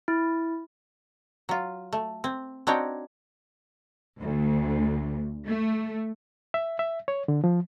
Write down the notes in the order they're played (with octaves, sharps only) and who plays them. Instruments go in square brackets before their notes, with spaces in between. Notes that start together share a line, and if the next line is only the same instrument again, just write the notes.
[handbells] E4
[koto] F#3 F4
A3
C4
C4 D4 D#4 F#4 C#5 G5
[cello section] D2
A3
[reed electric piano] E5
E5
C#5
D3
F3